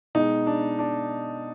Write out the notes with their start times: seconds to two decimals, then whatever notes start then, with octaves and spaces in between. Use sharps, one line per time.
0.15 B2 G#3 D#4
0.47 D4
0.79 D4